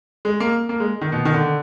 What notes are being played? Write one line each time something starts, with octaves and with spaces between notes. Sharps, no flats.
G#3
A#3
A#3
G#3
D#3
B2
D#3
D3